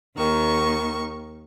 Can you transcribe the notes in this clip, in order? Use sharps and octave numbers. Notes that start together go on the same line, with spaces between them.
D#2 D#3 C#6